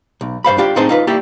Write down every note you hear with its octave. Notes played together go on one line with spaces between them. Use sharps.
B1
G2 C5 F5 B5
D4 F4 G4 F5
A2 C4 D#4 G#4 C5 A5
D#4 F4 B4
A#3 E4 G4 D5